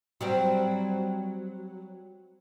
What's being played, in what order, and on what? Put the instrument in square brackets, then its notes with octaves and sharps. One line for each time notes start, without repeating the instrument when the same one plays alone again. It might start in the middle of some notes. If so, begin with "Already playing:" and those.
[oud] F#3 G3 C4